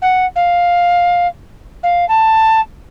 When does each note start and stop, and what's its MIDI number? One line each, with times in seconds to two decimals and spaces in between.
0.02 0.26 78
0.36 1.27 77
1.83 2.08 77
2.08 2.60 81